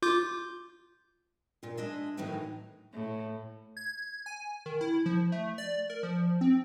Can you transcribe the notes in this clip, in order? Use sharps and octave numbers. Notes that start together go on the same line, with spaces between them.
F4 D6 G6
A#2 F4
G#3 D4 D#5 E5
A2 D#3 E3 F#3 A3 D#4
A2
G#6
G#5
D#3
E4
F3
A3
D5
A#4
F3
C4